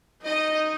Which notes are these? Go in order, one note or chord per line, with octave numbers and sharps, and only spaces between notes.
D#4 D#5